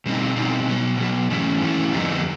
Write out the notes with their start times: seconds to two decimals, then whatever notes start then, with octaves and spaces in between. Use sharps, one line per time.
0.05 B2 G3 C4 D#4
0.36 B2 G3 C4 D#4
0.67 B2 F#3 B3
0.99 B2 F#3 B3
1.30 G#2 E3 A3 C#4 E4
1.61 G#2 E3 A3 C#4 E4
1.92 F2 D3 G3 B3 D#4